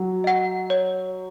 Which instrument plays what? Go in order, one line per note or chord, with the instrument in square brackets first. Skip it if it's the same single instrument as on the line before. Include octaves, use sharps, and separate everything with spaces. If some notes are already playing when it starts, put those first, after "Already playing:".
Already playing: [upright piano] F#3
[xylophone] D#5 F#5
C#5